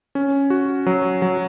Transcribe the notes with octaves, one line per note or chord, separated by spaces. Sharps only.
C#4
F#4
F#3
F#3